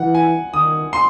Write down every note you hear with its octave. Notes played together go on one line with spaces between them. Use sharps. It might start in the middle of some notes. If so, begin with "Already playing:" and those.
Already playing: E3 F#5
G#5
D#3 D#6
C6